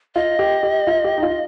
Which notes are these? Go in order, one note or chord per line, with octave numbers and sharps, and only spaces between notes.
F4 D#5
G4
G4
F4
G4
D#4
F4